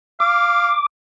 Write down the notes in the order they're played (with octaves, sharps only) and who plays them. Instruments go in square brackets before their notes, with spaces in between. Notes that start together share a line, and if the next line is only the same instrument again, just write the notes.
[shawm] F5 [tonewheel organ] D6